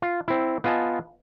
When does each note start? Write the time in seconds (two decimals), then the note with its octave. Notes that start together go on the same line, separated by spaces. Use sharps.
0.02 F4
0.28 C4 E4
0.64 B3 F4 D#5 G#5 A5